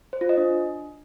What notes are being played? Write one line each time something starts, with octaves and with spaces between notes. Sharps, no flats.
C5
F4
D#5
D4